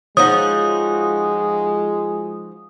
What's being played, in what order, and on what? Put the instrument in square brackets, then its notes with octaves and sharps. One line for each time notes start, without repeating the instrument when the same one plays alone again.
[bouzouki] F3 D#4 F#4 [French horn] G#3 [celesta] C#5 [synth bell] D#6